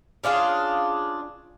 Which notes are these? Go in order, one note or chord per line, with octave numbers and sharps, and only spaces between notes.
C#4 D4 F4 G#4